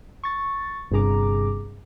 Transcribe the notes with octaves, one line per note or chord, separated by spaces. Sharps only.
C#6 A6
G1 G2 C3 G#4 A#5 D6